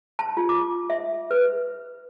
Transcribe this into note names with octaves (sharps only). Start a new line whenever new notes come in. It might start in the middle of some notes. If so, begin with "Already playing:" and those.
A5
F4
D6
E5
B4